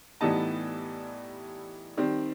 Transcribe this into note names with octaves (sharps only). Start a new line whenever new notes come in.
A2 E3 G3 B3 D#4 A5
D#3 G3 C4